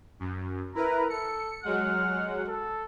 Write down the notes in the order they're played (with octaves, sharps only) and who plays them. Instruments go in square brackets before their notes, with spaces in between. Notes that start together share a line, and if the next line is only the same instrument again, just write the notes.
[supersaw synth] F#2
[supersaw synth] E4 A#4 B4 [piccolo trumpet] A#5
[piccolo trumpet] A4 [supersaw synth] C#7
[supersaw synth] F#3 G#3 F#5 [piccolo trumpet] F6
[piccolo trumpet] A4